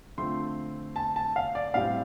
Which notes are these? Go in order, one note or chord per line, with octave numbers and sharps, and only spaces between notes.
D3 F3 A3 C4 C6
A5
A5
F5
D5
A2 G3 C4 F5